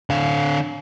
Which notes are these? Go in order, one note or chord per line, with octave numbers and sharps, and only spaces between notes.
D3 F5